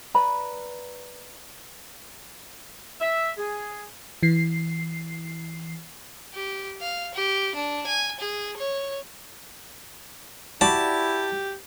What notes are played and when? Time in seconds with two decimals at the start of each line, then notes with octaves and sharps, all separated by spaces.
0.14 B4 D5 A#5 B5
3.01 E5
3.36 G#4
4.23 E3 C7
6.34 G4
6.81 F5
7.14 G4
7.55 D4
7.87 G#5
8.20 G#4
8.57 C#5
10.61 E4 F#4 G4 D5 A5 B5